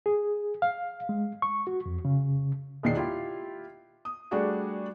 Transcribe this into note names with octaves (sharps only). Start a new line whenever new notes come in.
G#4
F5
G#3
C#6
F#4
F2
C#3
E1 A#2 D#3 G#3 D4 C7
E4 F4 G4
D#6
G3 A3 D4 F#4 G#4 F#5